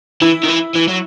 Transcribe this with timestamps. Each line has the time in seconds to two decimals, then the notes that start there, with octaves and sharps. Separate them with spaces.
0.22 E3 E4
0.43 D#3
0.48 E3
0.75 E3
0.88 F#3